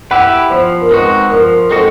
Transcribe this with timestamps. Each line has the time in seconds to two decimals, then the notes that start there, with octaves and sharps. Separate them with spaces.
0.11 E4 G4 B4 F#5
0.50 F3 C5
0.82 A#4
0.91 G#3 C4 D#4 F#4 B4
1.30 F3 A#4
1.71 G#3 C4 D#4 F#4 A4